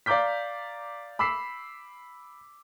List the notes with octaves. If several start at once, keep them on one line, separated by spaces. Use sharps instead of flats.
D5 F5 A#5 D6 G6 B6
B5 D6 E6 B6 C7